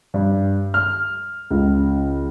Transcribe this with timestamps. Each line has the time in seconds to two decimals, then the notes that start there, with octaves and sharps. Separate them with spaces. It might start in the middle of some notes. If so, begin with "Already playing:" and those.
0.14 G2
0.74 F6
1.51 C#2